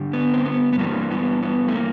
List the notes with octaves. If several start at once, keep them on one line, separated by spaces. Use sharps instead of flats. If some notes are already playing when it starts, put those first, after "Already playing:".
Already playing: G2 D3 G3
B3
C4
B3
B3
G2 E3 G3 A#3
B3
B3
A3
A#3